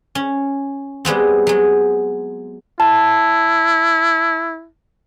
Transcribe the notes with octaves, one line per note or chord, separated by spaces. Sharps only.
C#4
G3 G#3 B3 C4
F#3 G#3
E4 A5